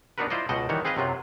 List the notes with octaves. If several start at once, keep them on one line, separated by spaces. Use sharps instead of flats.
B3 D4 D#4 F#4 A#4 B4
E4 F4 C5 D5 D#5
C#2 B2 D#5 F#5 G5 A5
D#3 E3 G3 F#4 C#5
C4 G#4 B4 D#5 F5
F#2 C3 F#3 F4